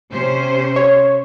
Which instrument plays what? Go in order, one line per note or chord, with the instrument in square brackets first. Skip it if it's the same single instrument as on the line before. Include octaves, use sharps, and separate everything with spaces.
[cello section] C3 C#4 C5
[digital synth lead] C#5